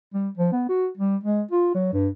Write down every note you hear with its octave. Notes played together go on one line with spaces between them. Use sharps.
G3
F3
B3
F#4
G3
G#3
F4
F#3
G2